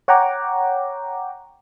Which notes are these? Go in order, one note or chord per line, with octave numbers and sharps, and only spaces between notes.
C#5 F#5 G5 A#5 D6